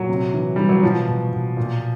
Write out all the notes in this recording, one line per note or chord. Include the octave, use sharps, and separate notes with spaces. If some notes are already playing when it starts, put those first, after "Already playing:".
Already playing: A#2 F#3
C3
E3
E3 G3
F#3
B2 F3
B2
B2
A#2